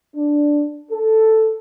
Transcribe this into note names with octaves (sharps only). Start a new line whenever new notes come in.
D4
A4